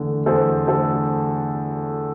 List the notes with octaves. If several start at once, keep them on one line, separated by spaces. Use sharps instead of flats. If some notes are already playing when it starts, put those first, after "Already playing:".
Already playing: E2 D3 A3
E2 A4 C5
D3 A3 A4 C5